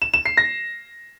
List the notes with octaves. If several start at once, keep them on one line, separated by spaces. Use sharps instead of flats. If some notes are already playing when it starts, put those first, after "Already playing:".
E7
E7
C7
A#6